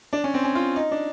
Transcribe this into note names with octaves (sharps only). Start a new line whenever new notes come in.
D4
C#4
C4
C#4
F4
D#4
D4